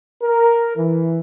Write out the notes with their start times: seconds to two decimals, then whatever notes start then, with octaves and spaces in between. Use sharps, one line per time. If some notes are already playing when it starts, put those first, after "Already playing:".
0.22 A#4
0.76 E3